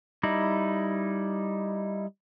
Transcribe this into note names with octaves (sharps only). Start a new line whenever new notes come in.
G3 D#4 E4